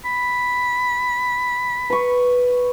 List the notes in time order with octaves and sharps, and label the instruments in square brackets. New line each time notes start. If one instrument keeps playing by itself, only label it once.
[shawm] B5
[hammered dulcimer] B4 C#6